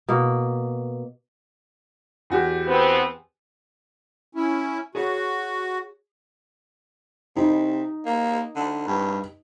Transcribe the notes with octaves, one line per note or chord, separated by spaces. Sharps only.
B2 A#3
E2 F#4 G4
B3 C4
C#4 E4
F#4 G#4 C#5
C3 D#4
A#3
D3
G2